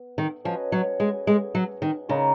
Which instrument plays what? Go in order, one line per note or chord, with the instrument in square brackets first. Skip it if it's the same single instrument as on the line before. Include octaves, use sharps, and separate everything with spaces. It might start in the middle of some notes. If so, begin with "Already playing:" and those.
Already playing: [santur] B3
[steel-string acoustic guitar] D#3
[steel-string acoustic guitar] F3 [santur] C#4 F#4 B4 D#5
[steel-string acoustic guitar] F#3
G#3
G#3
F#3
D#3
[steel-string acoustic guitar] C#3 [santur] G#3 D#4 A#4 D#5